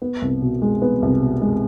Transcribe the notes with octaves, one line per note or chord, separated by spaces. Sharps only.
B3
C2
B2
G#3
B3
C2
B2
G#3